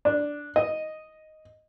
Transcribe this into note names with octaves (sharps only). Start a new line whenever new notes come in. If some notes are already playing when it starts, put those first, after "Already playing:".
D4
D#5